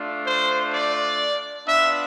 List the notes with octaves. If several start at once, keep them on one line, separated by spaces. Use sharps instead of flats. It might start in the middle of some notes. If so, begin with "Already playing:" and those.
Already playing: A3 D4 F4
C5
D5
B3 D4 F4 E5